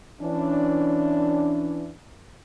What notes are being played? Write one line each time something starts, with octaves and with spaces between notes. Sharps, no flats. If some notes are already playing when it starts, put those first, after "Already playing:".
E3 C#4 D4